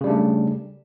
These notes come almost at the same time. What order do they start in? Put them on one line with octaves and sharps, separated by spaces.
C#3 G3 D4 A3